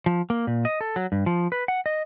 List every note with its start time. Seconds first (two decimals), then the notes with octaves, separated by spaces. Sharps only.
0.06 F3
0.30 A#3
0.47 A#2
0.65 D#5
0.81 A4
0.96 F#3
1.12 G2
1.26 F3
1.52 B4
1.68 F#5
1.86 D#5